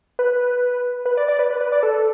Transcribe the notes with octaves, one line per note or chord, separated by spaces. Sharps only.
B4
B4
D5
D5
B4
B4
B4
D5
A4